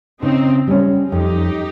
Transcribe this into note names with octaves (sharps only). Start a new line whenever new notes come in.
C#3 C4 D#4
G3 C#4
F2 D#4 G4